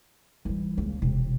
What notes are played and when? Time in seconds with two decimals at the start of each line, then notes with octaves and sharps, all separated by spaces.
0.45 E3 G3
0.77 C#2 A#3
1.02 E1 C3